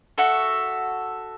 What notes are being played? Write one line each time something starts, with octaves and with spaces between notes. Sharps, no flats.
F#4 A4 E5